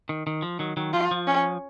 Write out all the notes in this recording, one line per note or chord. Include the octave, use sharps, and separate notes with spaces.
D#3
D#3
F3
D#3 F#3
D#3 F#3
F3 F4
F3
C#4